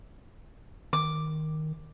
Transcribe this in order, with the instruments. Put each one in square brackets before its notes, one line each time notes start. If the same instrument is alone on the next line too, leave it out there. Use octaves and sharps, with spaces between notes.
[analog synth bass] D#3 [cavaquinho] D6